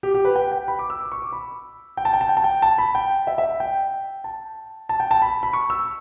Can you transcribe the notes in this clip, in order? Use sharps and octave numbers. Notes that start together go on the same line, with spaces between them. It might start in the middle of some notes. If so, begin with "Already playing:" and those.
G4
G4
B4
G5
G5
B5
D6
E6
D6
C#6
D6
B5
G5
A5
G5
A5
G5
A5
G5
A5
B5
G5
E5
E5
G5
A5
A5
G5
A5
B5
B5
C#6
E6